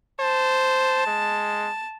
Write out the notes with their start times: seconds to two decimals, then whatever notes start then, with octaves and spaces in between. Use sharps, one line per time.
0.20 C5 A5
1.07 G#3